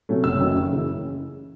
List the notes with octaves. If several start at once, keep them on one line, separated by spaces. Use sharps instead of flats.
C3 F#3 A3 C#4
F#1 E6
F#2 D#3 F#3 C#4
F#1
C#3 E3